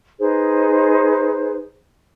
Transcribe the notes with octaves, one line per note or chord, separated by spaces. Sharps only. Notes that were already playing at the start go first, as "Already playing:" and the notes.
D#4 G#4 B4 C5